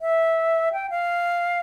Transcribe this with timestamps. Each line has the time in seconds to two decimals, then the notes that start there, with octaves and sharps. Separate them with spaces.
0.01 E5
0.73 G5
0.90 F5